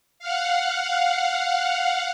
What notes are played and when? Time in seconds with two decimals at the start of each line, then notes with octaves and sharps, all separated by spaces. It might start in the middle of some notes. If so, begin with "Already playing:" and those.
0.19 F5 F#5